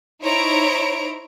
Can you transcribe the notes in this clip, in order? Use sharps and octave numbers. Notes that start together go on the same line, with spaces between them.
D#4 E4 C5 C#5 A#5 D7